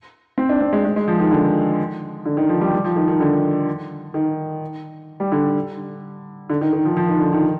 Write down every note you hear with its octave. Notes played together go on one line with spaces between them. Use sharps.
C4
D4
C4
G#3
G#3
G#3
F3
D#3
D3
D3
D#3
F3
G3
G3
F3
D#3
D#3
D3
D#3
G3
D3
D3
D#3
D#3
F3
F3
D#3
D3
D#3